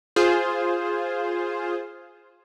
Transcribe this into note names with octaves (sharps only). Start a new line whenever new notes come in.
F4 G#4 C5